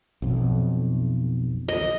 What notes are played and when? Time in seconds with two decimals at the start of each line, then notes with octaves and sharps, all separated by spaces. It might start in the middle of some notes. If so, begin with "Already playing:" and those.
0.22 B1 F2
1.68 D#5